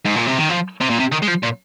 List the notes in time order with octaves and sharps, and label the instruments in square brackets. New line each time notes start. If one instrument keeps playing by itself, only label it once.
[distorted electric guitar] G#2
A#2
C3
D#3
F3
C3
A#2
C3
D#3
G#3
F3
A#2